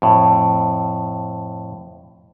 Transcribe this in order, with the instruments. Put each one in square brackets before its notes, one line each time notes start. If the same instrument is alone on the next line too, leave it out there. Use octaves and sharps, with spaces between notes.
[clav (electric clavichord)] F2 A2